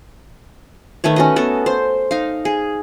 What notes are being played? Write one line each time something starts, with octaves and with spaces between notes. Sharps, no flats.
D#3 A3 B4 C#5
C#4 F#4 D#5
B3 A4
C5
D#4 F5
G#4